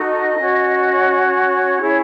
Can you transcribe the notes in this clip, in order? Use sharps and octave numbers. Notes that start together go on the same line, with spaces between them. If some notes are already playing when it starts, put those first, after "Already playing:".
Already playing: D#4 F#4 A4 D#5
C#4 F#4 C#5
C#5
C#4 E4 G#4